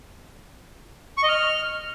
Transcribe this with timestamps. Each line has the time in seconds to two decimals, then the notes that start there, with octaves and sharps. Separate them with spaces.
1.18 C#6
1.23 D#5
1.29 F6